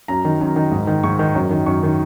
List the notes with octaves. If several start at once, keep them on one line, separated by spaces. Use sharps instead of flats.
F#2 A#5
D#3
F#2
D#3
G#2
D#3
G#2 C#6
D#3
F#2
D#3
F#2 C#6
D#3